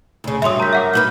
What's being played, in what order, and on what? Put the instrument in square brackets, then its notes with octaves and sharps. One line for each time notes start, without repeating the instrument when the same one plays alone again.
[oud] D2 C#3
[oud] G2 F#3 [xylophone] E5 C6 D#6
[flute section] A#4 G6 [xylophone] A#5 B6
[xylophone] E5 F#5 D6
[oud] D#4 F#4 B4